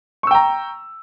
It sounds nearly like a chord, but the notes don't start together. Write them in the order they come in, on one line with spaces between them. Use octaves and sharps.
C#6 E6 G5 A#5